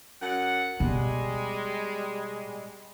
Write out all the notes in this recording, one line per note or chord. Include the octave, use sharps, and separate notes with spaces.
F#2 F#3 F#5
B2 G3 G#3